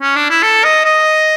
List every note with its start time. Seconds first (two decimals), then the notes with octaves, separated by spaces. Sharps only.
0.01 C#4
0.16 D4
0.30 E4
0.43 A4
0.64 D#5
0.85 D#5